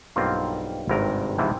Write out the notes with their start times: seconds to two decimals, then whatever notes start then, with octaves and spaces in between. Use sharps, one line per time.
0.16 B1 G2 A#3 C4 F4
0.89 G#1 G2 C3 A#4
1.38 G#2 C3 E3 F3